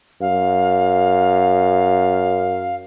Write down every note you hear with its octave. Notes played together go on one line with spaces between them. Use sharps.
F#2 F5